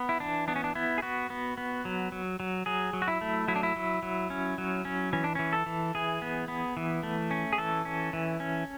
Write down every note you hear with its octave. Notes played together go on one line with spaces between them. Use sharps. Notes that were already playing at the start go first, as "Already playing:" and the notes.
Already playing: B3
E4
E3 D4
B3 D4
C#4
D4
B3 E4
G#4
B3 F#4
B3
B3
F#3
F#3
F#3
F#3 G#4
F#3
F#4
E4
A3
F#3 E4
D4
E4
F#3
F#3
C#4
F#3
C#4
E3 C#4
D4
E3 C#4
A4
E3
E3 G#4
B3
B3
E3
A3
C#4
G#4
E3 A4
C#4
E3
C#4